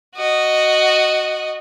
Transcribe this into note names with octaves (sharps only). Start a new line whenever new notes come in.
F#4 D#5